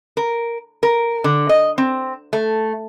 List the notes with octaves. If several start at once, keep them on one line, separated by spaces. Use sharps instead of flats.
A#4
A#4
D3
D#5
C4
A3